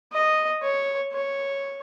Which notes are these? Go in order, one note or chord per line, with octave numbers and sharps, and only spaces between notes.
D#5
C#5
C#5